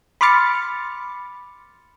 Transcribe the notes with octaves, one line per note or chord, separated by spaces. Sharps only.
B5 C6 D6 F6 A6 C#7